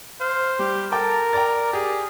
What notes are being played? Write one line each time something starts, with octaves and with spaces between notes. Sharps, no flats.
C5 F5
G3 G4
A4 A#4 G5 A5 D6
D5 G5 A#5 A6
G4 G#4